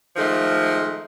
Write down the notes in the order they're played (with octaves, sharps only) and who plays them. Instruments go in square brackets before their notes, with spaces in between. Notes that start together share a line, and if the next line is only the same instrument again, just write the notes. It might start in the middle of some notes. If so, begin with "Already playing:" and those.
[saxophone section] D#3 F3 G#3 A3